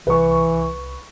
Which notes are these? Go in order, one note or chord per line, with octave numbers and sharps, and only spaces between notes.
C2 E3 B4 C#6